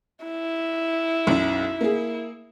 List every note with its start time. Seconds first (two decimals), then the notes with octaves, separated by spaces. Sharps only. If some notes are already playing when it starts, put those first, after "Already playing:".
0.24 E4
1.27 B1 F#2
1.81 A#3 G#4